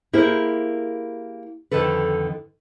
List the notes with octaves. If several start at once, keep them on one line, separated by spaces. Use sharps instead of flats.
A#3 E4 G4 G#4 A#4 C5
F2 D3 D#3 A4 B4